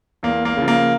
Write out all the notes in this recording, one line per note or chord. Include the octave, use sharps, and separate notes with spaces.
E2 A#3
A#3
C#3 F3
A#3